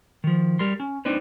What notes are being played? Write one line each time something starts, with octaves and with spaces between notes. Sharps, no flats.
D#3 F3
G3 A#4 C6
C#4
C4 D4 D#4 B4 C5